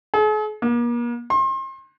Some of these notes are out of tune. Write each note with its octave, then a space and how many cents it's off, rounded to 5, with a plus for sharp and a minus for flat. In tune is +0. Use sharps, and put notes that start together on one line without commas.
G#4 +45
A#3 +40
C6 +35